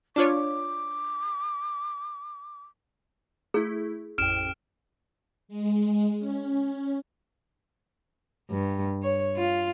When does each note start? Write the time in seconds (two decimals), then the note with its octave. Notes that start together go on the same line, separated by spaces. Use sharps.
0.16 D4 F4 C#5 D6
3.54 A3 E4 G#4
4.18 A1 F2 G5 F6 D7 E7
5.48 G#3
6.19 C#4
8.51 G2
9.03 C#5
9.37 F4